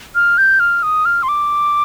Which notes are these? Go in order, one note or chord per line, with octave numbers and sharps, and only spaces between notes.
F6
G6
F6
D#6
F6
C6
D6